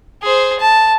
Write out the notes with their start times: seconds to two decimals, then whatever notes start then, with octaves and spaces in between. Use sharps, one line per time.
0.23 G#4 C5
0.60 A5